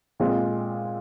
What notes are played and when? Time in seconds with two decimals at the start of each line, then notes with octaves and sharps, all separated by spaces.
0.20 A#2 G#3 C4 F4